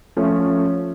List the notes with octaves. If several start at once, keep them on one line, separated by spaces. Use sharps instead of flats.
F3 A3 C#4